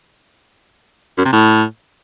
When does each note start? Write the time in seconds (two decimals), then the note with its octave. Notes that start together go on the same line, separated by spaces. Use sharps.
1.18 F#2
1.25 C3
1.33 A2